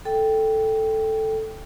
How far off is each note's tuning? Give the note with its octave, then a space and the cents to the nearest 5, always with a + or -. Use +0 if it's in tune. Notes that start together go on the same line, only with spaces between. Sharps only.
A4 +0 G5 +0